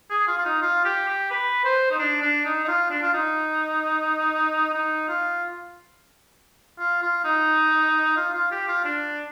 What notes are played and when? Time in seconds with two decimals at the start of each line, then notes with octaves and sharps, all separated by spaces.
0.10 G#4
0.28 F4
0.38 F4
0.45 D#4
0.62 F4
0.85 G4
1.08 G4
1.31 B4
1.65 C5
1.91 D#4
1.99 D4
2.22 D4
2.45 D#4
2.64 D#4
2.68 F4
2.91 D4
3.03 F4
3.14 D#4
4.74 D#4
5.09 F4
6.79 F4
7.03 F4
7.25 D#4
8.17 F4
8.34 F4
8.52 G4
8.68 F4
8.85 D4